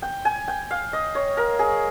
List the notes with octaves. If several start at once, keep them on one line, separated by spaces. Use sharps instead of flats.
G5
G#5
G5
F5
D#5
C#5
A#4
G#4